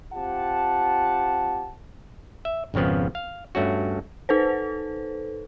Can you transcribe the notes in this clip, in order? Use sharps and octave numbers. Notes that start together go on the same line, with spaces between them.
C4 F4 G4 F#5 A5
E5
G#1 F2 C#3 F3 B3
F5
G2 A3 C#4 F#4
D#4 A4 B4 C5